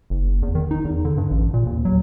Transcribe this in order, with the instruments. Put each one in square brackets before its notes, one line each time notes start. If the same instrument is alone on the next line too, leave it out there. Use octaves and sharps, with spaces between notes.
[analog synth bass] F#1
E2
D#3
D#4
E2
D3
G2
A1
A#2
D#2
F#3